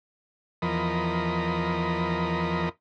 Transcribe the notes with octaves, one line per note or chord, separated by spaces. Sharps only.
E2 F3 A#4 D#5 B5